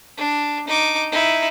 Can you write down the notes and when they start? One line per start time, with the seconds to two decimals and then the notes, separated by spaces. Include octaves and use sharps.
0.17 D4
0.67 D#4 D6
1.12 D#4 E4